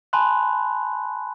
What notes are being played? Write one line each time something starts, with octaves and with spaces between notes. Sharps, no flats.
G#5 A5 B5 C6 F#6